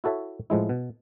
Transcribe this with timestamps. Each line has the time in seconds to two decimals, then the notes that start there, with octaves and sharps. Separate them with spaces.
0.04 E4 F#4 A4 C#5 E5
0.50 A2 F3 G#3 E4
0.69 B2